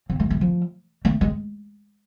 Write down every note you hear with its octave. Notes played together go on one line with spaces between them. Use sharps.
C4
A3
A3
F3
A3
G#3